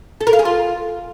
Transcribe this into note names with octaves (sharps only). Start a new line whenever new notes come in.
A4
A#4
F5
G#4
F4